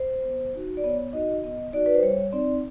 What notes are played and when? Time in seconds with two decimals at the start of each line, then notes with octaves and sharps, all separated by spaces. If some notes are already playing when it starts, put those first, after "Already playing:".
Already playing: C5
0.23 B3
0.54 D#4 F#4
0.77 D5
0.84 B3 C#5
1.13 D#4 F#4 D#5
1.43 B3 D#5
1.73 D#4 F#4 D5
1.86 B4
1.94 C5
2.02 G3 C#5
2.32 C4 D#4 D5